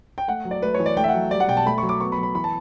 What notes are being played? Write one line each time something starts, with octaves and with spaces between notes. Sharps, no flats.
G5
A3 F#5
F#3
D5
A3 B4
C#5
E3
D5
A3 G5
E5
F#5
F#3
G3 D5
F#5
B2 G5
A5
A3 B5
F#3 C#6
D6
B3 C#6
B5
F#3
B5
E3 B5
A5